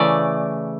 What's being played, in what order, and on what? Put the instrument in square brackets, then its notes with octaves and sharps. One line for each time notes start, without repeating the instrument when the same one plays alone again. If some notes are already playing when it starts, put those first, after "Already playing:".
Already playing: [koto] C#3 E3 A3 D5